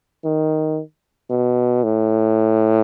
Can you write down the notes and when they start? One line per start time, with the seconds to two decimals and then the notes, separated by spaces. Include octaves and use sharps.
0.24 D#3
1.30 B2
1.83 A2